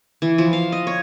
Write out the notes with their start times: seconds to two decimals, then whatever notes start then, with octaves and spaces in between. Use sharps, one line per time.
0.22 E3
0.38 F3
0.53 F5
0.72 D#5
0.87 C#5